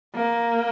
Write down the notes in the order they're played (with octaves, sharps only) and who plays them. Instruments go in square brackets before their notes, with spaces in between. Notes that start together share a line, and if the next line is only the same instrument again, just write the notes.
[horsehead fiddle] A#3